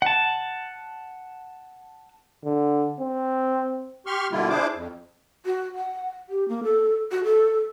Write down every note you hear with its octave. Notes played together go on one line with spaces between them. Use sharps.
F#5 A5
D3
C4
G4 C6 C#6 F6
B2 D3 G3 A#3 E4 F4
D4 E4 G#4 C5 D6
F2
F#4
F#5
G4
A#3
A4
F#4
A4